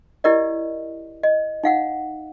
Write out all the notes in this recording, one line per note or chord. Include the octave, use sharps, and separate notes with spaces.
E4 G4 A#4 D5 D#5
D#5
D#4 F5 F#5